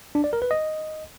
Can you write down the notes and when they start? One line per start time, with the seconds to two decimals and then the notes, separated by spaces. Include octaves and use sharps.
0.15 D4
0.24 D5
0.33 A#4
0.42 B4
0.51 D#5